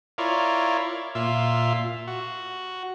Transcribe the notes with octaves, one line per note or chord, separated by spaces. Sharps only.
E4 F4 A#4 C#5 D5
A#2 F4 E5
F#4